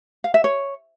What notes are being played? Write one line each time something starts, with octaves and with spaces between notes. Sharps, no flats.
F5
E5
C#5